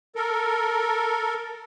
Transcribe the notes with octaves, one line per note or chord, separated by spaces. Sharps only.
A4 A#4